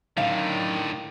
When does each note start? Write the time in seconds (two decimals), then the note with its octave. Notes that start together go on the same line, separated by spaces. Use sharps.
0.17 F#2 A2 D3 D#3 F5